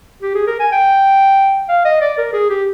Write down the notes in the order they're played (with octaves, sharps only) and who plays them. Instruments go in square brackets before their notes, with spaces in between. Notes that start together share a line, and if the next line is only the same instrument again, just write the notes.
[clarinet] G4
G#4
A#4
G#5
G5
F5
D#5
D5
A#4
G#4
G4